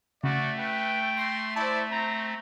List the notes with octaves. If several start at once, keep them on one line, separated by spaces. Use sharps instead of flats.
C#3 A3 F#4 D5
B4 G5
C6 A#6
E4 C5 D5 A5
C4 A#5